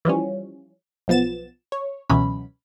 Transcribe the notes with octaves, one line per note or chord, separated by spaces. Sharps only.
E3 F3 G3 C#4
B1 F3 B3 A6 E7
C#5
C#2 B2 E3 F#3 C#4 B5